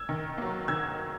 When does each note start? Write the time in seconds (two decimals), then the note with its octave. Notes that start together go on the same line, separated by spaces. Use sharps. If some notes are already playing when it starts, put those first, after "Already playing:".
Already playing: E6 G#6
0.09 D#3
0.38 F#3 A#3
0.68 D#3 E6 G#6